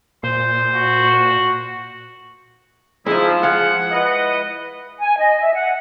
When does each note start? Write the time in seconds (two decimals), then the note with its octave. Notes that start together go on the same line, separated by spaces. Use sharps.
0.23 A#2 C5
0.73 F#4
3.06 F3 G#3 D#4 E4
3.43 G#3 F5 F#5
3.92 E4 B4 D#5
4.99 G#5
5.19 D#5
5.41 E5
5.54 F#5